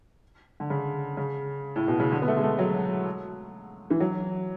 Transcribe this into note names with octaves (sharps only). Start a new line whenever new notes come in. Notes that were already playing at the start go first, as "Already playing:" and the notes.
D3
C#3
C#3
A2
B2
C#3
D3
B3
A3
G#3
A3
F#3
E3
F#3